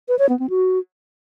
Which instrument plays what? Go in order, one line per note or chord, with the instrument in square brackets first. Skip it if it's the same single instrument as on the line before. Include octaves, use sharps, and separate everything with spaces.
[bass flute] B4
C#5
B3
C4
F#4